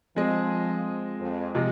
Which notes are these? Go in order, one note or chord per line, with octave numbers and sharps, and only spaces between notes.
F3 G#3 C4 G#4 D#5
F2
C3 F3 G#3